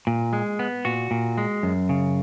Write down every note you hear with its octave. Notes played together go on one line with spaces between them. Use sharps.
A#2
G#3
B3
A#2 F#4
A#2
G#3
F#2
C#3